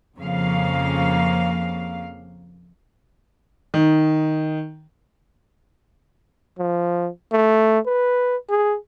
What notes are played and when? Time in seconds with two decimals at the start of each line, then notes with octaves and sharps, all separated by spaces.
0.18 F2 C#3 F3 A#3 F5
3.74 D#3
6.59 F3
7.32 A3
7.86 B4
8.50 G#4